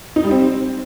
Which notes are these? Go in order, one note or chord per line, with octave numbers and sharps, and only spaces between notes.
D#4
G3
C4